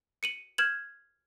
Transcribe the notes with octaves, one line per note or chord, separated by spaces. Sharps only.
C#7 D#7 F#7
F6 G6 G#6 E7 F#7